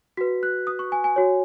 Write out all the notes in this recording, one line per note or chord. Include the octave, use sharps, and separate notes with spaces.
F#4 B4 B6
F#6
D#6
C#6
G#5
G#5
F#4 C#5